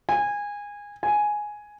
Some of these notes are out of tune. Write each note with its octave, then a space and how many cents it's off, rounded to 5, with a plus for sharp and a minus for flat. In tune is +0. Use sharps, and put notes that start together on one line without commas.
G#5 -20
G#5 +5